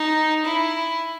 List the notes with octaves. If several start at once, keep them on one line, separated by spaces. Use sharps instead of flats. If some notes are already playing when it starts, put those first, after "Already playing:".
Already playing: D#4
E4